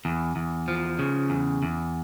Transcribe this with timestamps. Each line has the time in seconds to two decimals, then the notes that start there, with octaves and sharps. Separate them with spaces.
0.05 E2
0.36 E2
0.68 F3
0.99 C#3
1.30 E2
1.63 E2